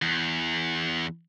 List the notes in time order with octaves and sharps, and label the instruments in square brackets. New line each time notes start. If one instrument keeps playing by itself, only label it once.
[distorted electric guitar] E2